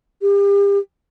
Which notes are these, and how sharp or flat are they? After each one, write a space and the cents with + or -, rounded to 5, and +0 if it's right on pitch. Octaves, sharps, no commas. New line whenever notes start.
G4 +35